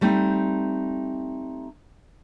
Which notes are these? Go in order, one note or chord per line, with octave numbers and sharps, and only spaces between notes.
G3 A3 C4 D#4